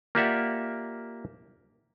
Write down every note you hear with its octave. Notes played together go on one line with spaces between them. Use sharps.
A#3 F4 G4 D5 E5 F#5